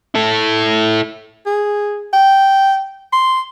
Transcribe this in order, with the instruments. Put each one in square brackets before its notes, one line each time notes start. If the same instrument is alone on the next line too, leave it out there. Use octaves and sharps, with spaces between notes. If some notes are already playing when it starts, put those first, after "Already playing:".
[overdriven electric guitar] E4 A4
[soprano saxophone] G#4
G5
C6